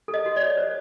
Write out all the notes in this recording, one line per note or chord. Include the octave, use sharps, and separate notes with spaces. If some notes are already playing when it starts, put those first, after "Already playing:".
A4
D#5
F#4
D5
C#5
C5